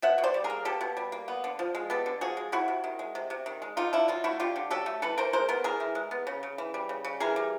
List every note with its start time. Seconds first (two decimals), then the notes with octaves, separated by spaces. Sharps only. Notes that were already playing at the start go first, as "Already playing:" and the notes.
0.02 B2 E5 F#5
0.18 B2
0.24 C5 D5
0.34 G3
0.44 G#4 A#4
0.50 A#3
0.65 B2 G4 A4
0.81 B2
0.97 G3
1.12 A#3
1.28 B3
1.44 D3
1.59 F3
1.75 G#3
1.90 B3 G4 A4
2.06 D3
2.21 F3 F#4 G#4
2.37 G#3
2.52 C3 E4 F#4
2.68 C3
2.84 D#3
2.99 G#3
3.15 C3
3.30 C3
3.46 D#3
3.62 G#3
3.77 D3 D#4 F4
3.93 D3 D4 E4
4.08 F#3 D#4 F4
4.24 A3 E4 F#4
4.40 D3 F4 G4
4.56 D3
4.70 F#3 G4 A4
4.86 A3
5.02 E3 A4 B4
5.18 E3 A#4 C5
5.33 G#3 A#4 C5
5.49 B3 A#4 C5
5.64 E3 G#4 A#4
5.80 E3
5.95 G#3
6.11 B3
6.27 C#3
6.43 C#3
6.58 E3
6.74 G3
6.89 C#3
7.05 C#3
7.20 E3 G#4 A#4
7.36 G3